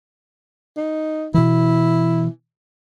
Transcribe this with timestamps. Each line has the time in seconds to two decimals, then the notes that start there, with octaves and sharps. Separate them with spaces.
0.77 D#4
1.34 B2 E3 E4